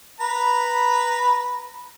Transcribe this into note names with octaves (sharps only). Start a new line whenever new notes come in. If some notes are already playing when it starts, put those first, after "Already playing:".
B4 A#5 B5